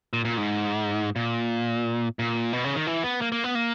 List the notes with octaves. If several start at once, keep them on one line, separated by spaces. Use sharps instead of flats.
A#2
A#2
G#2
A#2
A#2
B2
C#3
D#3
E3
B3
A#3
A#3
B3
A#3